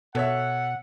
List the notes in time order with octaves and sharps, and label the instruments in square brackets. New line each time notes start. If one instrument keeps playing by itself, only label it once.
[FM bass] B2 [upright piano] A4 C#5 E5 [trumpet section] F#5